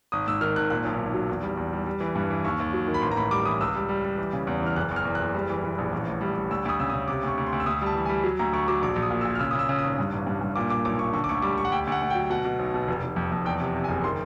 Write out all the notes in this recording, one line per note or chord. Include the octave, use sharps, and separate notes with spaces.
G#1 D#6
G#2 E6
D#3 F6
G#1 F#6
A#2 F#6
B1
B1
F#3
E2
G3
E2
G3
G3
E3
G2
E3
D#2 C#6
D#2
F#3
D#3
B5
A1 C6
A#5
A2 B5
G3 D6
E3 D#6
C#2 E6
G3
G3
G3
E3
C#3
E2
E3 F6
F#1 F#6
E2
F6
E2
F#1 F#6
G3
E3
E3
A#1
A1
A2
G3
G3
D2 E6
D2 D#6
C#3 E6
D#6
C#3
C3 D6
D2 C#6
D2
C6
D2
E6
D2 D#6
G3 A5
E3
G#5
G3
F#3
D2 A#5
D2 C#6
F#3 D6
A#1 D6
A#1
D#6
A#2
E6
A#2
F6
C#3 E6
D#6
C#3 E6
C#3 E6
D#6
G#1
G2
A1
G2
G2
A#2 D6
A#2 D6
B1 D6
B1 C#6
D3 C#6
D6
D2 C#6
G3 D6
G3 C#6
F#5
D2 G5
D2 F#5
D2
G5
F#3
B2 F#5
B2
B1
B2
F1
F1
F2
F2
E2 G5
C3
C3
G#5
F#1
D#3 C6